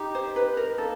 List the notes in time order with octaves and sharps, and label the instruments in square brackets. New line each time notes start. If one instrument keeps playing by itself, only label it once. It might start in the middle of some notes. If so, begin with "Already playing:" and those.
Already playing: [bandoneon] D#4 G4
[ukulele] C5
[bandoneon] D#4 [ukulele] B4
[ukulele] A#4
[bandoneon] A#3 [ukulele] A4